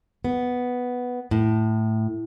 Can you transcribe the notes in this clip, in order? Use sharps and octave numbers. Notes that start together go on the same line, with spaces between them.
B3
A2